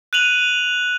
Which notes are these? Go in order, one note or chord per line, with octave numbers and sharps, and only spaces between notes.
F#6 D#7 F7 F#7